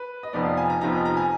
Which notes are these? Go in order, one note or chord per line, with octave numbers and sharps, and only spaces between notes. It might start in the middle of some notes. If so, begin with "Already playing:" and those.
Already playing: B4
D#5
F1 F2 F3 B3 D#4 D5
F5
G#5
A#5
F1 F2 F3 B3 D#4 A#5
A#5
G#5